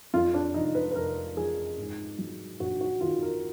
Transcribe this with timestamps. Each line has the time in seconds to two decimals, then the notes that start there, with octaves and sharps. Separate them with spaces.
0.13 F2 F4
0.34 D4
0.54 F1 D#4
0.75 B4
0.91 B4
0.95 F1 A#4
1.37 F3 G#4
1.78 G#2
2.18 F#3
2.60 A#1 F#4
2.81 F#4
3.01 D#3 F4
3.23 A#4